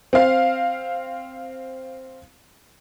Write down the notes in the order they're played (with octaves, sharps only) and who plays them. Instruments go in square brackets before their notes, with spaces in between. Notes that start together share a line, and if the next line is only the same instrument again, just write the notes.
[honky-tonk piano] C4 F5